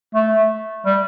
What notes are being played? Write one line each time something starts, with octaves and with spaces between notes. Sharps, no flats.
A3
G3